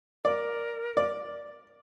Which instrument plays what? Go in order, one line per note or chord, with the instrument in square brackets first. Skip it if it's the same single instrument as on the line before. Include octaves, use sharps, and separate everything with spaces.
[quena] A#4 [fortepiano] D5
[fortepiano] D5